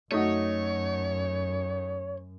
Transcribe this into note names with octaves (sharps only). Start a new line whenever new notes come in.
F#2 A3 D#4 F#4 C#5